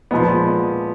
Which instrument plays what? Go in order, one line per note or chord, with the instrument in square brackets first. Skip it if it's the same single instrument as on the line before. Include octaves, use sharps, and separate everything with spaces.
[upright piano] A#2 F3 G#3 B3